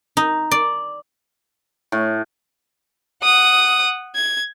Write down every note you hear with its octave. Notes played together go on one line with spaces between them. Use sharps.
D#4
D5
A2
F#5 D#6
G#6